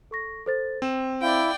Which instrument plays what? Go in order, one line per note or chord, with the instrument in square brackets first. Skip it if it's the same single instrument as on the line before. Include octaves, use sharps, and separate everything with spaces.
[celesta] A4 C#6 A#6
A4 C5 A6
[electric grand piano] C4 [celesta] G5 E7
[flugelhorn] E4 [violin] D5 G5 [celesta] F5